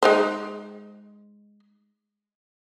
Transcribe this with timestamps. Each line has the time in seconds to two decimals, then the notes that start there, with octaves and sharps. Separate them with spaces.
0.03 G#3 D#4 C5